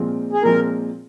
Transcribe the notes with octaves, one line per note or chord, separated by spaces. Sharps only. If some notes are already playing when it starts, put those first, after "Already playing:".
Already playing: A#2 F3 G#3 C4
G#4
A#2 F3 G#3 C4 A#4